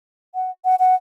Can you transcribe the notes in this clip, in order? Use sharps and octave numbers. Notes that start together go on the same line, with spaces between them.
F#5
F#5
F#5